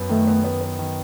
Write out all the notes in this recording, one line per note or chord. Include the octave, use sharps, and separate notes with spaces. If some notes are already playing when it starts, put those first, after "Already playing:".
Already playing: F#2 B3
D#3 A3
B3
B3
B3
D#3